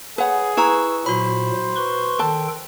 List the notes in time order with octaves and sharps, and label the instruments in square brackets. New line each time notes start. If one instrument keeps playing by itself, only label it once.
[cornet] G#4 [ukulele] B4 C#5 F#5
[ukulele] E4 A#5 [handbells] B4 C#6 E6
[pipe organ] A#2 F#3 [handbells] F#4 B5 [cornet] C5
[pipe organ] B4 C6 C#6
[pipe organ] D#3 A4 G5 [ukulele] A5